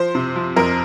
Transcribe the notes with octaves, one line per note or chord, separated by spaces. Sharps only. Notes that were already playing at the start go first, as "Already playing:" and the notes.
Already playing: F3 C5
C3
F3
F2 A#4